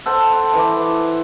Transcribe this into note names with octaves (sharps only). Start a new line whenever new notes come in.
A4 C5 F#5
E3 D6